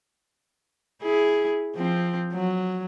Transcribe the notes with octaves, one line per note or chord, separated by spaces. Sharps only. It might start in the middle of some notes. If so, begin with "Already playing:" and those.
E4 G#4
F3 C4
F#3